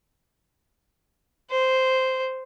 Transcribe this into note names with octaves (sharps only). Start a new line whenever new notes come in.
C5